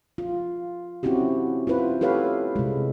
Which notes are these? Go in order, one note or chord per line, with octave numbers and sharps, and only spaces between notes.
F4
C4 C#4 E4 F#4 G4
E4 F4 B4 C5
G4 A4 B4 C#5 F5
C3 G#3